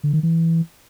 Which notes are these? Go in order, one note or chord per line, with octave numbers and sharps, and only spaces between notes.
D3
D#3
E3